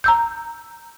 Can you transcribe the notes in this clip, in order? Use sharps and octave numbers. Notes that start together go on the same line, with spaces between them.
A#5 E6 G6